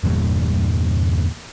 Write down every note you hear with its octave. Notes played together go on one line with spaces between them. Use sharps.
G1 E2 A#2 G3